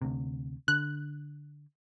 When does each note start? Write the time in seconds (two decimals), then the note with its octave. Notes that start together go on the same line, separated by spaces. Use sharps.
0.02 D2 C3
0.68 D3 F#6